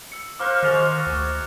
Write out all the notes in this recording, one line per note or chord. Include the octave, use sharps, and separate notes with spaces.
E6 C#7
A#4 C5 F5 D6 F6 F#6
D#3 F#4 G#4 D#5 F6 A6 F7
D2